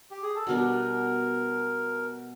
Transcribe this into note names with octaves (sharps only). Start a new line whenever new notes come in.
G4
G#4
A4
B2 G3 B3 D4 A#4